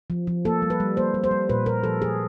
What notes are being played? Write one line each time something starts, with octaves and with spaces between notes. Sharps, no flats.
F3
F3
A#3 A4
G3
B4
G3
A#3 C5
G3
C5
G3
A#2 B4
A#2 A#4
F3 A4
F3 G#4